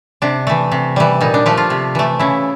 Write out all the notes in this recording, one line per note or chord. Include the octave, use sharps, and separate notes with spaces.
C3 D4
E3 A3
C3
E3 G3
A#2 D#4
D4
F3 A3 G4
F4
C3
E3 A3
C#3 E4